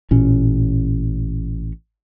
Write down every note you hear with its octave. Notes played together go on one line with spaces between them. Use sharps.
A1 A#2 C#4